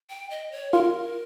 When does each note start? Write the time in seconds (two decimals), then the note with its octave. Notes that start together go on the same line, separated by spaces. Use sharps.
0.10 G5
0.30 D#5
0.52 C#5
0.72 F4 A#4